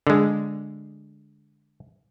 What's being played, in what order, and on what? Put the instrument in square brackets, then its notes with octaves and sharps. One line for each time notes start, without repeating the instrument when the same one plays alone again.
[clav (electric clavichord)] D3 G#3